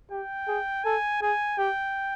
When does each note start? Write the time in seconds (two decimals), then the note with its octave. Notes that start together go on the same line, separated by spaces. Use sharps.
0.11 G4 G5
0.48 G#4
0.84 A4 G#5
1.21 G#4 G#5
1.58 G4 G5